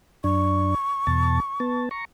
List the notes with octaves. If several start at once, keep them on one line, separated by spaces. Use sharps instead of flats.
F#2 D4 C#6
E2 B2 A5
B3 A5
A#5 C#6